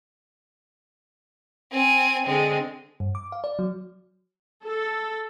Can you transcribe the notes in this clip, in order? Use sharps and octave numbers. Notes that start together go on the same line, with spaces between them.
C4 G#5
D3 G#3 C4
G2
D6
F5
D5
F#3
A4